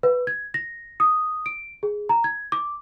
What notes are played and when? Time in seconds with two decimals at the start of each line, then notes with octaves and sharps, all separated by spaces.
0.03 B4
0.27 G#6
0.54 A#6
1.00 D#6
1.46 D7
1.83 G#4
2.09 A#5
2.24 G#6
2.52 D6